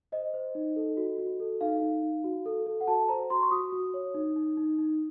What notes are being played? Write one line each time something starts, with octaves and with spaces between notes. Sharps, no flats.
C5 D#5
C5
D#4
A4
F#4
F#4
A4
D#4 F5
D#4
D#4
F#4
A4
A4
F#5
F#4 A5
C5 A#5
F#4 C6
C#6
F#4 D#6
F#4
C#5
D#4
D#4
D#4
D#4